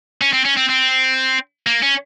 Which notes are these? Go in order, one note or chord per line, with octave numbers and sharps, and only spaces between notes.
C#4
C4
C#4
C4
C4
A#3
C#4